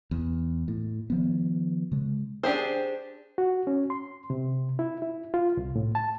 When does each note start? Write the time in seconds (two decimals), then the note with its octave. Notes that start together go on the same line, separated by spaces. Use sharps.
0.11 E2
0.68 A2
1.10 D#3 F3 B3
1.92 C#3 G#3
2.43 D4 G4 G#4 C5
3.38 F#4
3.67 C#4
3.90 C6
4.30 C3
4.79 E4
5.02 E4
5.34 F4
5.57 C2
5.76 A2
5.95 A5